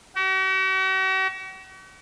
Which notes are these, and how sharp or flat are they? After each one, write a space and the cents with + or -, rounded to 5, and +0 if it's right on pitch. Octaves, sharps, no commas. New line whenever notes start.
F#4 +45